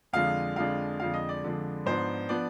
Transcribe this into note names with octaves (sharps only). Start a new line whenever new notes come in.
F2 D3 F3 G#3 D4 F5
F2 D3 F3 G#3 D4 F5
F2 D3 F3 G#3 D4 F5
D#5
D5
F2 D3 F3 G#3 D4
G#2 F3 B3 D4 C5
F3 B3 D4 D5